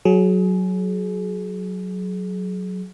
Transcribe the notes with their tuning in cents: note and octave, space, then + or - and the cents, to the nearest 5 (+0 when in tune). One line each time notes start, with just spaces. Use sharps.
F#3 +0 G#4 +30